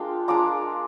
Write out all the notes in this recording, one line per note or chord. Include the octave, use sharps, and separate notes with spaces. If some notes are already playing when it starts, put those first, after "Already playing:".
Already playing: G#3 D4 F4 A#4 F5 G5
G#3 D4 F4 A#5 D6